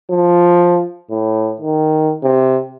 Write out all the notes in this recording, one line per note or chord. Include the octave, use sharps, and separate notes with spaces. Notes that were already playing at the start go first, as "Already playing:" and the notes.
F3
A2
D#3
C3